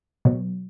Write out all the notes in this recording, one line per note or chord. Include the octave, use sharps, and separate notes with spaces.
B2 F#3